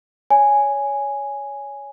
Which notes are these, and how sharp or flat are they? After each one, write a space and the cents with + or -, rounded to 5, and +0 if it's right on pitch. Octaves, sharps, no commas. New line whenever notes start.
C#5 +20 G#5 +0